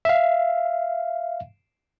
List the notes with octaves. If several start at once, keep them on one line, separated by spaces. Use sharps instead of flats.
E5 F5